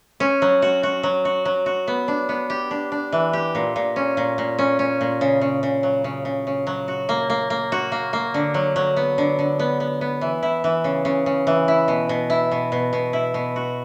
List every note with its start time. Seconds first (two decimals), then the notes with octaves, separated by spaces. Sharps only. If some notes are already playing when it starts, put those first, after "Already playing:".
0.20 C#4
0.42 F#3
0.62 F#4
0.83 F#4
1.03 F#3
1.25 F#4
1.45 F#3
1.66 F#4
1.88 B3
2.08 D4
2.29 B3
2.50 G4
2.71 D4
2.92 D4
3.12 E3
3.33 G4
3.55 A#2
3.76 A#2
3.96 C#4
4.17 A#2
4.38 A#2
4.59 C#4
4.79 C#4
5.01 A#2
5.21 C#3
5.41 C#3
5.63 C#3
5.83 F#3
6.04 C#3
6.25 C#3
6.47 C#3
6.67 F#3
6.88 F#4
7.09 A#3
7.30 A#3
7.50 A#3
7.72 F#4
7.92 A#3
8.13 A#3
8.34 D3
8.54 F#3
8.76 F#3
8.96 B3
9.18 D3
9.39 D3
9.59 B3
9.80 B3
10.01 B3
10.21 E3
10.43 E4
10.64 E3
10.84 C#3
11.05 C#3
11.26 C#3
11.47 E3
11.68 E4
11.88 B2
12.09 B2
12.30 E4
12.51 B2
12.72 B2
12.93 B2
13.13 E4
13.34 B2
13.56 F#4